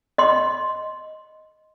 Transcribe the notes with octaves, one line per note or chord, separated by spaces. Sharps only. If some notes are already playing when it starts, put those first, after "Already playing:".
D#5 C6